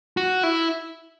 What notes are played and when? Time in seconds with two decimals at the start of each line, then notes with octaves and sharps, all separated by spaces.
0.17 F#4
0.43 E4